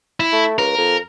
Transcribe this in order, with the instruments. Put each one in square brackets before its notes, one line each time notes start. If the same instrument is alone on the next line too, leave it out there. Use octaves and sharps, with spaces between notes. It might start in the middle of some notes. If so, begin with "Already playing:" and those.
[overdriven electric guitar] E4
[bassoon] A3
[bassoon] C#2 [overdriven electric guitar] A#4
[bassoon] F2